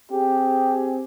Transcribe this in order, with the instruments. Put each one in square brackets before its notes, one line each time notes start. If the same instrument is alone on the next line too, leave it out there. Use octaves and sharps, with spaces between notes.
[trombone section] C4 G#4 [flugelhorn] G4